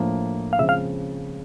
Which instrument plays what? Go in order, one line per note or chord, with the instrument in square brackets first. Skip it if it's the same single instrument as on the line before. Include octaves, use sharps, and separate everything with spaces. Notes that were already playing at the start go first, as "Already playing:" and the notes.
Already playing: [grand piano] A2 F3 A#3 D4
[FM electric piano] F5
[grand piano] C#3 F3 G#3 C4 [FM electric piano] E5
[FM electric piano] F5